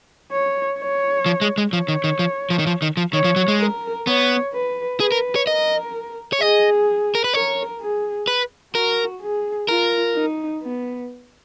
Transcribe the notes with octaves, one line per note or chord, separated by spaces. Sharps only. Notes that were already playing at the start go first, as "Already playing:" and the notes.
C#5
C#5
F3
G#3
G#3
F3 C#5
D#3
D#3
F3
F3
D#3
F3
D#3
F3
D#3 C#5
F3
F#3
G#3
A#4
B3 C#5
B4
G#4 B4
A#4
C#5
A#4 D#5
C#5
G#4 D#5
A#4
B4
A#4 C#5
G#4
B4
F#4 A#4
G#4
F4 A#4
D#4
B3